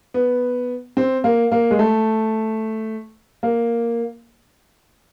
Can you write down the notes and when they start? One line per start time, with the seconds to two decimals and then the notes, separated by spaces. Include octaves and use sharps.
0.14 B3
0.97 C4
1.24 A#3
1.52 A#3
1.71 G#3
1.79 A3
3.43 A#3